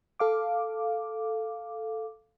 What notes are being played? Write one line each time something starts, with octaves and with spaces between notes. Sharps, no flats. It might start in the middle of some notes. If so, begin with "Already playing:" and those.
A4 F5 D6